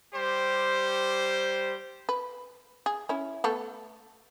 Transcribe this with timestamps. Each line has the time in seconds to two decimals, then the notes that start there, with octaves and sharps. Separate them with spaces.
0.14 G3 G4 C5
2.09 B4
2.86 G#4
3.09 C#4 E4
3.44 A3 B3 A4